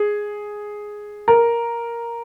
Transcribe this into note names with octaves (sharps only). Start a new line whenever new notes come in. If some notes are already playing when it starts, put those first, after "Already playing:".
Already playing: G#4
A#4